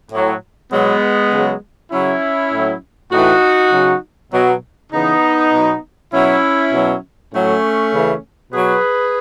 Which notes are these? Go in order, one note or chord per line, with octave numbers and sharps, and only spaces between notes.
A2 F#3
B2 F#3 G#3 B3
C#3 F#3
C#3 F#3 C#4 E4
A2 F#3
A2 E3 D#4 F#4
C#3 F#3
B2 F#3
C#3 E3 B3 D#4
B2 F#3
B2 F#3 C#4 E4
B2 F#3
A2 F#3 A3 C#4
C#3 E3
B2 F#3 G#4 B4